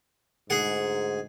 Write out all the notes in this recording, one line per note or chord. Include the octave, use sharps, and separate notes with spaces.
D2 G#2 G#4 F#5